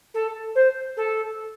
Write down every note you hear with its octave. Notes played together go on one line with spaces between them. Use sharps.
A4
C5
A4